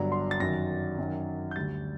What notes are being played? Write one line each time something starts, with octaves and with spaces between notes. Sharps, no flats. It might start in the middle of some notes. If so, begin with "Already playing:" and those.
Already playing: G1 G2 D3 F#3 A#5
C6
A6
F#2 D#3 F#3 A#6
F#2 D#3 F#3
G6
D2 D3 G3 A6